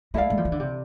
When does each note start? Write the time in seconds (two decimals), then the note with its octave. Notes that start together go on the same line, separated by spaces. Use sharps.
0.14 G#3 E4 A4 D5 F5
0.30 G#3
0.37 F3
0.45 E3
0.52 D3
0.60 C3